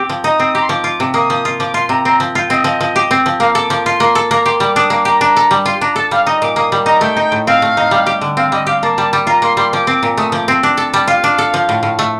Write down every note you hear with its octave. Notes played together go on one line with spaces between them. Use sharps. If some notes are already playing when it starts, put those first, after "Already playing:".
Already playing: C4 G4
F3
D#4 D#6
C4
G4 A#5
C6
F3 D6
F4
C3
A#3 D#6
F3
F4
F3 D6
F4 C6
C3 A#5
C4 A#5
F3
F4 G5
C4 D#5
F3
F3
G4
C4
F3
A#3 F5
A4 D6
F3 D6
F4 C6
A#3
A4
A#3 A#5
G4 C6
G3 D6
D4 D#6
A#3 D6
G4 A#5
D4 A#5
A4
G3
F4 C6
D4 A#5
A4 A5
G3 F5
D#4 D#5
A#2 D6
A#3 D#6
G3
D#4 A#5
A3 G5
D#4
A2
C4 F5
A3
D#4
G3
G4
D3
C4 F5
G3 D#5
G4 F5
A#3 A5
G3
G3
F4 A#5
A#3 C6
G3 C6
F3 D6
C4
A#2
A3 D#6
F3 D6
C4 C6
D4
A4 A5
G3 A5
F4 F5
D4
A4
F3
A2
A2
A3